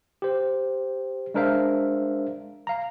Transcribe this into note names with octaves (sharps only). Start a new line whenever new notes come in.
G4 C5
G#3 D4 A#4 C5 E5 F5
F5 A#5